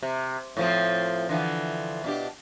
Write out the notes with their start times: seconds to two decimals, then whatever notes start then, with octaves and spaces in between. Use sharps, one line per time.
0.03 C3
0.57 A2 F3 C4
1.29 D3 E3 F3
2.04 B2 D4 G4